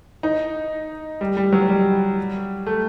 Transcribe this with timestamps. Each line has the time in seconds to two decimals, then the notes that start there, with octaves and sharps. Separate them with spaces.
0.23 D#4
1.21 G3
1.37 G3
1.53 F#3
1.69 G3
2.66 A3